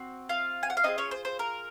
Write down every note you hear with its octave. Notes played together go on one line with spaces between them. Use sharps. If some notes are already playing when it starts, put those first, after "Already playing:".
Already playing: C4 F#4
F4 F5
G#5
F#5
F5
C4 D#4 F4 G#4 D#5
C#4 C#5
C5
C5
A#4